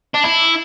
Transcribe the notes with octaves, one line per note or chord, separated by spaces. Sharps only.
D4
E4